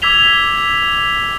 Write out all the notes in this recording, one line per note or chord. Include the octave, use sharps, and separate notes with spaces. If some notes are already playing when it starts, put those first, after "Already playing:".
D6 E6 G#6 B6 F7 G7